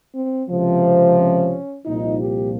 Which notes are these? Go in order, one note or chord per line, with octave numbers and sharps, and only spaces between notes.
C4
C#2 C3 F3
C4
C#4
C2 A#2 F3 D#4
G4